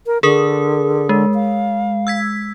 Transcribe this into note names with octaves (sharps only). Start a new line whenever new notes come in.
A#4
D3 G#4 A#4 D#6
G#3
F5
E6 G#6 B6